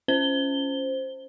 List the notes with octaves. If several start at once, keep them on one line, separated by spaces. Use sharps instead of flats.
C#4 C5 G7